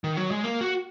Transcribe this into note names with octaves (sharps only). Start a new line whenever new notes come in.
D#3
F#3
G#3
A#3
F#4